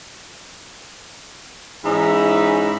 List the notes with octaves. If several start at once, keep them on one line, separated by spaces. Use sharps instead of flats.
G#2 E3 C#4 D#4 E5 B5